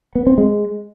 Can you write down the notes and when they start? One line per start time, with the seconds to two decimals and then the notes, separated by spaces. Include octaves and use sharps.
0.15 B3
0.27 C4
0.38 G#3